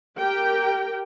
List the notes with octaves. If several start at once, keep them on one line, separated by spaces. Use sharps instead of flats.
G4 A#4 G5